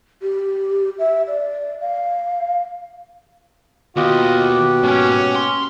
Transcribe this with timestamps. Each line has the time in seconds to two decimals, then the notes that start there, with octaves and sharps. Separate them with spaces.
0.22 G4
0.99 E5
1.27 D5
1.81 F5
3.96 D#2 B2 F4 G4 D#5 F#5
4.83 G#2 A#3 C#4
5.36 C6